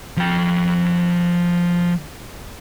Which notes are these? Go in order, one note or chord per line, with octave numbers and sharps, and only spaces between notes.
F3 G5